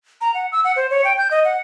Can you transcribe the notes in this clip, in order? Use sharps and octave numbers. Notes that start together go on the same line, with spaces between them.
A#5
F#5
E6
F#5
C5
C#5
G5
G6
D#5
F#5